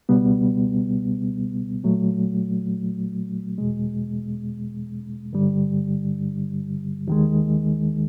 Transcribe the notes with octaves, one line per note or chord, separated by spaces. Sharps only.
C#2 B2 G3 B3
A#2 F#3 A3
E2 B2 G#3
G2 D3 G3
D#2 D#3 G#3